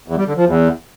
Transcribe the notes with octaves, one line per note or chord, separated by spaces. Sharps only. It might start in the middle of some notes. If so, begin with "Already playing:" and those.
E2
G3
D3
F3
E2